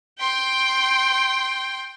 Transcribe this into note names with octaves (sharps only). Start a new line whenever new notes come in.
G5 C6